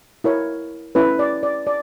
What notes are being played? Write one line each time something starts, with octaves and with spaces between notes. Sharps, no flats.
E4 A#4 C#5
C#4 E4 B4
D5
D5
D5